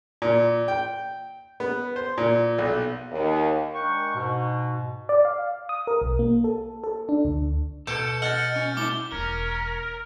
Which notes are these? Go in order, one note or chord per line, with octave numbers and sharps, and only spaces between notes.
A#2
G5
B3
C5
A#2
B1
D#2
G#3 D4 A#4 F#5 G5 C#6
G#2 B2
D5
F5
D#6
A#4
B1
A#3
A4
A4
D4
D2
B2 A4 G6 C#7
D#5 F#5 F6 G6 A6
C#4
A3 E4 E5 D6 G7
E1 C#4 E4 A#4